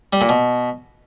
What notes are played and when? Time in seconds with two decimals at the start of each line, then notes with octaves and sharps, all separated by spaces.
0.13 G3
0.21 A#2
0.29 B2